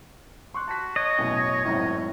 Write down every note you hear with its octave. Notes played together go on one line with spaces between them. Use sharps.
C6 C#6 F#6
F#4 A5 B6
C#5 D#5
A1 F#2 B2
G#1 F#2 A2 C#5